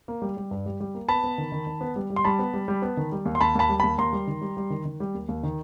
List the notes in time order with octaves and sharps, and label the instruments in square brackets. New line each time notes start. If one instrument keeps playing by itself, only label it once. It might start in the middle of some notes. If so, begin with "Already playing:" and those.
[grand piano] A#3
G3
G3
G2
G3
G3
A#3
B3 A5 B5
B3
D#3
D#3
D#3
B3
G3
G3
C6
G3 A5 B5
B3
G3
G3
B3
D#3
G3
D#2
C6
D#2 A5 B5
D#2 A5 B5
G3
D#2 A5 B5
D#2 A#5 C6
G3
D#3
G3
G3
D#3
D#3
G3
D#2
D#2
D#3